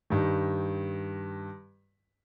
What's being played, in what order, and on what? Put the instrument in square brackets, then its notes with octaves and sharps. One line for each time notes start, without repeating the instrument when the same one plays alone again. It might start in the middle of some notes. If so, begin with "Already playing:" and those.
[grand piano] G2 D#3